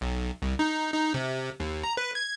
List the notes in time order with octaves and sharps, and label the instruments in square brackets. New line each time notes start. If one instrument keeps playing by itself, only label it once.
[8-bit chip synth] B1
C2
D#4
D#4
C3
D#2
A#5
B4
G#6